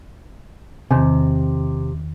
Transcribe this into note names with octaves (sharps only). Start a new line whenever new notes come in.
E2 C3 D#3